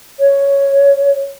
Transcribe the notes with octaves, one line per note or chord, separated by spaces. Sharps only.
C#5